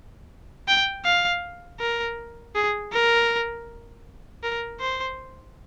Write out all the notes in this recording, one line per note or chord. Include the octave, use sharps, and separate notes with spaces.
G5
F5
A#4
G#4
A#4
A#4
C5